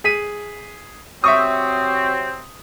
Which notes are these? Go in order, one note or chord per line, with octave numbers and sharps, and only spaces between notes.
G#4 B6 D#7
C3 F#3 C4 E5 C#6 D#6